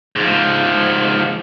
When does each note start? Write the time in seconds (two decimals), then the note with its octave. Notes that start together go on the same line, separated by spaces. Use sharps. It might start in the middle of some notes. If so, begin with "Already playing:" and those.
0.16 G#2 F3